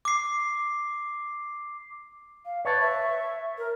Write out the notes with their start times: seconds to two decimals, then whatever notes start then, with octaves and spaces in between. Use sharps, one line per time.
0.05 D6 C7
2.45 F5
2.65 B4 C#5 A5
2.81 E5
3.58 A#4